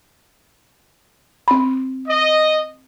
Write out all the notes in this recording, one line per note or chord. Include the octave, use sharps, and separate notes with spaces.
C4 B5
D#5